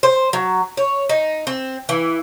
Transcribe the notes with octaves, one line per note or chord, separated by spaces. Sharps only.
C5
F#3
C#5
D#4
C4
E3